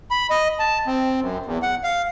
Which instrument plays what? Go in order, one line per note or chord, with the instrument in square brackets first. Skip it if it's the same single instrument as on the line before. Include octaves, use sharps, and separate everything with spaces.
[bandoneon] B5
D#5
A5
C4
F#2
E2
F#5
F5